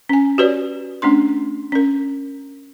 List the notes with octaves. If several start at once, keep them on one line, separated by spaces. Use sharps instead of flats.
C#4 G#5
F#4 G4 B4 C#5 D5
A3 C#4 D4 C6
C#4 A#4